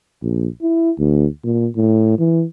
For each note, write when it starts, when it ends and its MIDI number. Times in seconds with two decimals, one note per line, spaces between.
0.23 0.47 34
0.63 0.91 64
0.99 1.26 38
1.43 1.67 46
1.76 2.14 45
2.18 2.44 52